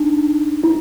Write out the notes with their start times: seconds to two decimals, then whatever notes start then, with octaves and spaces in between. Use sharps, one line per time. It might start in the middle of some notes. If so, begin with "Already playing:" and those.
Already playing: D4 D#4
0.64 E4